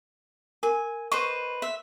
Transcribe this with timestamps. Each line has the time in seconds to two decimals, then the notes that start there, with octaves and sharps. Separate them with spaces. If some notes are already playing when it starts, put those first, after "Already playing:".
0.63 A#4 G#5
1.12 B4 C5 D#5 C#6
1.62 E5